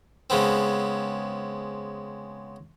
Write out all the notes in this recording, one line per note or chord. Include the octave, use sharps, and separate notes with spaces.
C#3 G#3 B3 C4